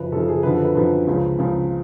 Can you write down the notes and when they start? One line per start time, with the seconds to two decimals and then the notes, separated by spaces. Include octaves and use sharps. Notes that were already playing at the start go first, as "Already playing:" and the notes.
Already playing: F#2 C#3 F3 B4
0.12 F#2 C#3 F3 A4
0.28 G#4
0.43 F#2 D3 F3 B4
0.54 A4
0.65 B4
0.75 F#2 D3 F3 B4
1.07 C#2 C#3 F3
1.39 C#2 C#3 F3